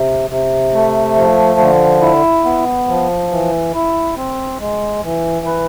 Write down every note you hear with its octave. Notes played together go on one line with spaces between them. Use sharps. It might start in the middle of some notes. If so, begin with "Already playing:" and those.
Already playing: C3
C3
A3
F3
D3
E4
B3
F3
E3
E4
C4
G#3
E3
B4